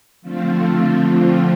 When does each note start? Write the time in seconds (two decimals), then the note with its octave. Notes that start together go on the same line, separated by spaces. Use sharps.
0.22 D3 F3 A3 C4 F4